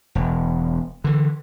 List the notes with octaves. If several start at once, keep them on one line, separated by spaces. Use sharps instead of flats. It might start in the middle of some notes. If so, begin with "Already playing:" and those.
E1
D3 E3